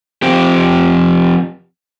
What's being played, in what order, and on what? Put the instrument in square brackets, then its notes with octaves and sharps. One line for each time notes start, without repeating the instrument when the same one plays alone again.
[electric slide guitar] F3 C4 G4